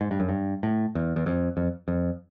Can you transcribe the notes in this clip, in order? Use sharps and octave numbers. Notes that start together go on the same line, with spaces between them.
G#2
G2
F#2
G2
A2
E2
E2
F2
F2
F2